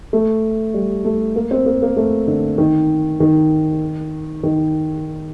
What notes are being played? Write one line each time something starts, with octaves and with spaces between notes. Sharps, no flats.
A3
G3
A3
A#3
C4
A#3
A#3
A3
D3
D#3
D#3
D#3